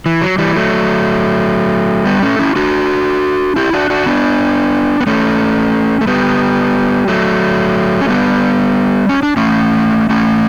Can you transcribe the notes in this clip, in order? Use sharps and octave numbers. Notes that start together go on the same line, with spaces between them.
E3
F#3
E3 G3
F#3 A3
G3 B3
A3 C#4
C#4 E4
D4 F#4
E4 G4
D4 F#4
D4 F#4
B3 D4
B3
A3 C#4
A3
G3 B3
F#3 A3
C#4
G3 B3
C#4
D4
A3 C#4
A3 C#4